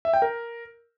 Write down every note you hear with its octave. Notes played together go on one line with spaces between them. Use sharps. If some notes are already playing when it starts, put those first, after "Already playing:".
E5
G5
A#4